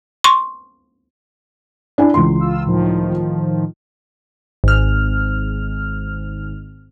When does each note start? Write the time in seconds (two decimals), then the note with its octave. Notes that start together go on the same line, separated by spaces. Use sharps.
0.24 C6 C#6
1.98 D4 E4 G#5
2.14 C#2 E3 C6
2.39 F4 E6
2.66 A2 D#3 F3
4.64 G#1 F6